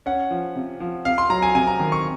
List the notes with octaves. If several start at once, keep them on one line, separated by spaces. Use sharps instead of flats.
C#4 F#5
F3
C3
F3
C3 F5
C6
F#3 A#5
G#5
C3 G#5
A#5
D#3
C#6